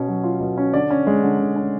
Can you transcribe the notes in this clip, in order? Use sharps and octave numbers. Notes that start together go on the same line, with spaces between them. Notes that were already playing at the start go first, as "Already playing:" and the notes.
Already playing: B2 C#4 C#5
F#3
F4
B2
C#4
D3 D5
C#4
G#3
D3
D3
C#4